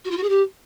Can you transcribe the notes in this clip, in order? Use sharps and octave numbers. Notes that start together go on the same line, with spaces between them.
F#4
F4
F#4
G#4
G4